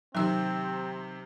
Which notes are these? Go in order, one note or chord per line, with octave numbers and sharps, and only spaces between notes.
C3 D#3 F#3 C4 E6